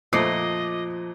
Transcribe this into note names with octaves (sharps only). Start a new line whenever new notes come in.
F2 A#2 F3 A3 D#5 D6 D#6 C7